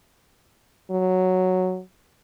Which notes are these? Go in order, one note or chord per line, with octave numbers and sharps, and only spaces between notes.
F#3